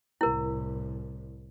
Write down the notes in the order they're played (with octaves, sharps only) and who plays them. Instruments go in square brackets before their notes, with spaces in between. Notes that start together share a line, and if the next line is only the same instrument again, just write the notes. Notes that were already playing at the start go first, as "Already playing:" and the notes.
[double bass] C2 A2 [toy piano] E4 A#4